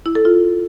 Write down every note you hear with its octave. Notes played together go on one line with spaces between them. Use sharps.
E4
A4
F4